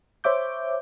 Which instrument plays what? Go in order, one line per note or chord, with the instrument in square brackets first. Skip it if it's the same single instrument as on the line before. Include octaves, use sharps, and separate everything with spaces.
[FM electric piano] C5 C#5 E5 D6 G6